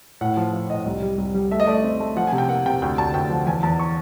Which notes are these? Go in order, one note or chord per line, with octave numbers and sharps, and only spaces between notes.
A2 F#5
F3
F3 F5
A2 D#5
C2
G3
C2
G3
A3 E5
D#5
A3 D5
D#5
C4
A3
F3 F#5
G#5
C3
G5
A#3 F#5
C3 G5
D2 G5
D2 A5
D2 G5
F3 F#5
E2 G#5
E2 A5
C#6